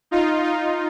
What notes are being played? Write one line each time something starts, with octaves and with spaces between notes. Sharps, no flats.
D#4 F4
D#4 F4